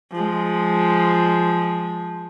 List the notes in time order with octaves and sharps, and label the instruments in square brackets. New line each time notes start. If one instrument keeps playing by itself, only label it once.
[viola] F3 G#3